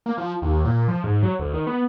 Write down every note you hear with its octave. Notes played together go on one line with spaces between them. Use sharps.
A#3
F3
D#2
A#2
F3
G#2
F#3
D2
D#3
B3